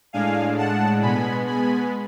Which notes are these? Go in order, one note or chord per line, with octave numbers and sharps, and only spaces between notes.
A2 G#3 D4 F5 G#5
F#5 A5
B2 G#3 B3 G#5 B5
G#5 B5